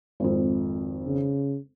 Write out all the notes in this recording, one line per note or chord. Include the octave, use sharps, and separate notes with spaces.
G#1 F2
C#3